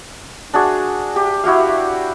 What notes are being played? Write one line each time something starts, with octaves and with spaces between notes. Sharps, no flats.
D4 F#4 G#4
G4
E4 F#4 G4 F5